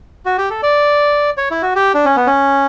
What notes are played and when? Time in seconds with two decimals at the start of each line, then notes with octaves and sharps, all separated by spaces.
0.26 F#4
0.38 G4
0.50 A4
0.63 D5
1.37 C#5
1.51 E4
1.62 F#4
1.76 G4
1.94 D4
2.05 C#4
2.16 B3
2.27 C#4